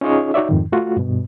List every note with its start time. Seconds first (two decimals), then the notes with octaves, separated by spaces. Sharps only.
0.01 C#4 D#4 F4 G#4 C#5 D#5
0.34 D#4 F#4 C#5 D5 E5
0.49 F2 G#2 D#3
0.72 A3 F4 F#4
0.97 G2 B2